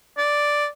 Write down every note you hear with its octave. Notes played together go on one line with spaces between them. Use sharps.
D5